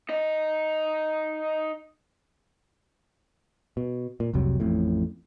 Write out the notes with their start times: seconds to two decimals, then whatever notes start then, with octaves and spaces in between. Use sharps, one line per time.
0.09 D#4 D#5
3.77 B2
4.20 A#2
4.34 F1 C2 C3 F#3
4.60 A1 F2 A2